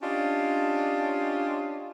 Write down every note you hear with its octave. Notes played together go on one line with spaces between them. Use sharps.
C#4 D4 F4 G4 C#5 D#5